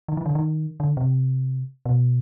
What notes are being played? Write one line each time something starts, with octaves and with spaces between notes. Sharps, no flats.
D#3
E3
D3
D#3
D3
C3
B2